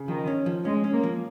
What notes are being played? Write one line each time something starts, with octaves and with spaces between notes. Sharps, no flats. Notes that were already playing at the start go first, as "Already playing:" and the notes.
Already playing: C#3
D#3 F3
C#4
F3
G#3 C#4
C#4
A#3
F3